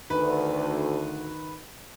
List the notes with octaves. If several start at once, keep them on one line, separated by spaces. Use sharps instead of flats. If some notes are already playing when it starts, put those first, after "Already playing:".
D2 D#3 B4